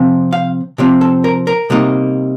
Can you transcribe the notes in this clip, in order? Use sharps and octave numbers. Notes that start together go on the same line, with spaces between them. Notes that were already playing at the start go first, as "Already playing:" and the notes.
Already playing: C3 F3 C4
F5
C3 F3 C4 G4
A4
A#4
A#4
C3 G3 A#3 D#4